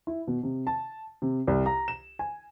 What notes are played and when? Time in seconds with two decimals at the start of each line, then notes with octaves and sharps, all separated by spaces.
0.07 E4
0.27 B2
0.43 C3
0.67 A5
1.22 C3
1.47 C2
1.66 A#5
1.88 E7
2.19 G#5